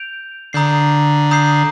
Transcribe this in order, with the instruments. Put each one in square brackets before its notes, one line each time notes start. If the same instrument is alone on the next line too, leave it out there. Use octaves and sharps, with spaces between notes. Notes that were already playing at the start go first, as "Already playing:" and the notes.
Already playing: [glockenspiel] G6 D7 F7
[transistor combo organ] D3 [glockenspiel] A#5 D#6 G6 C7
[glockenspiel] A#5 D#6 G6 C7